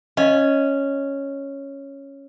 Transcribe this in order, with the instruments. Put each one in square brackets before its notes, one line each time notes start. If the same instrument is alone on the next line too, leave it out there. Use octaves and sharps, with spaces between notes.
[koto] C#4 [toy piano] D#5 F5